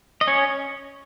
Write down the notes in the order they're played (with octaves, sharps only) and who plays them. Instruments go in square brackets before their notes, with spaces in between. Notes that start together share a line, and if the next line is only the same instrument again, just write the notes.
[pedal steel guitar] D#5
C#4 C#5